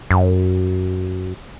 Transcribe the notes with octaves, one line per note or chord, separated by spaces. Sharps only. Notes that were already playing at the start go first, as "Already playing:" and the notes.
F#2